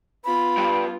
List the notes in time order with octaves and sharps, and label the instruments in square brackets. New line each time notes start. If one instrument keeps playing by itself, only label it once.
[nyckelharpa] B3 F4 [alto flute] B5
[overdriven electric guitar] G2